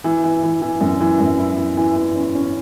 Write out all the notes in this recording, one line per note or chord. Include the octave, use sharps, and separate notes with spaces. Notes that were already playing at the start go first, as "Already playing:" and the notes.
E3
E3
E3
E3
F#2
E3
F#2
E4
E3
E3
E3
C#4
C#4